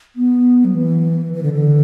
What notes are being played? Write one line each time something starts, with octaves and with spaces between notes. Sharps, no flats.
B3
F#3
E3
E3
D3
D3